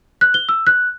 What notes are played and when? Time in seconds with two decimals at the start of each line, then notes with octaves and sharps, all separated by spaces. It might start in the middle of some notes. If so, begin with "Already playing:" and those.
0.21 F#6
0.34 G7
0.49 E6
0.67 F#6